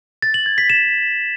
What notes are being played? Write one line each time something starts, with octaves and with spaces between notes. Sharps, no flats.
A6
F#7
G#6
B6
E7